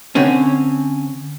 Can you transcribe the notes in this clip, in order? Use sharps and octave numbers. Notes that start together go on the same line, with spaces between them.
D3 C4 C#4